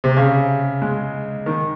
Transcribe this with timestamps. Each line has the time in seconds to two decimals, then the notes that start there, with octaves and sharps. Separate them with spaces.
0.04 C3
0.17 C#3
0.82 G#3
1.46 D#3